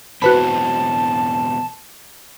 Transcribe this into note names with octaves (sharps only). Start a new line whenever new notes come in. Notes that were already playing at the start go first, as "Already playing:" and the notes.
B2 E3 C4 F#4 B4 A5 B5